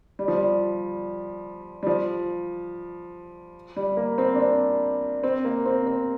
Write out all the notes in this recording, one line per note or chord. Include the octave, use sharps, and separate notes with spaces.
G3
F3
G3
G3
F3
G3
A#3
C4
D4
C4
C4
A#3
C4
C4